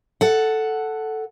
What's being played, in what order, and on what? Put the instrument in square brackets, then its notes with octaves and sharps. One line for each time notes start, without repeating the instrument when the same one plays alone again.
[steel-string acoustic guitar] A4 F#5